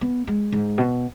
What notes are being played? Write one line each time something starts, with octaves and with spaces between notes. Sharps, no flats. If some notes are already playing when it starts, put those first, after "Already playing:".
B3
G#3
G#2
B2